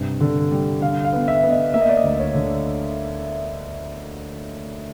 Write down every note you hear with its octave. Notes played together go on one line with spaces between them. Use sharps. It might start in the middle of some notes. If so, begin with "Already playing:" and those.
Already playing: G2 C3
D3
G3
D3 F5
F5
B3
E5
B3
D#5
A#3 E5
D#5
D5
D#5
D2
C#5
D3